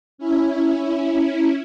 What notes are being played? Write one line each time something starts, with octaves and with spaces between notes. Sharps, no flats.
C#4 E4